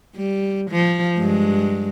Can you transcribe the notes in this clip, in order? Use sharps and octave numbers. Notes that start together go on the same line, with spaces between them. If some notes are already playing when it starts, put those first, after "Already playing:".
G3
F3
G2 G#3